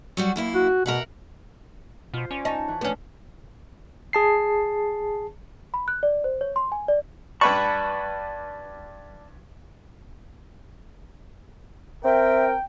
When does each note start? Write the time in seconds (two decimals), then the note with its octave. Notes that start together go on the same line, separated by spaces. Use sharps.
0.17 F#3 G3 F#4
0.36 F#2 A#3 E4
0.55 F#4
0.86 B2 A#4 E5 F#5
2.14 B2 F4 C5
2.31 C#4 D5
2.45 D#4 C#5 A5
2.68 E3
2.81 F3 A3 B3 C#4 D4
4.13 G#4 A5 C7
5.74 B5
5.88 F#6
6.03 D5
6.24 C5
6.41 C#5
6.56 C6
6.72 G#5
6.88 D5
7.41 G2 B4 D5 A5 B5 C#6
12.04 C4 A#4 E5 G5